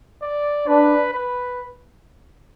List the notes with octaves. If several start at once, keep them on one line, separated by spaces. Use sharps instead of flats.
D5
D4 B4
B4